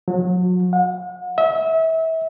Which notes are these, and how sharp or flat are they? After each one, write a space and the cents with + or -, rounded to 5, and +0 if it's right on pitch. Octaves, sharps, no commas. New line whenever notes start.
F#3 -35
F#5 -40
E5 -30